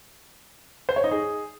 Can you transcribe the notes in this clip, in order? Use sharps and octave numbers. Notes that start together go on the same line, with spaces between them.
C5
C#5
D#4
G#4